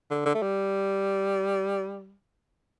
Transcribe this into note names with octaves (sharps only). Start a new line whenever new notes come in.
D3
D3
A3
G3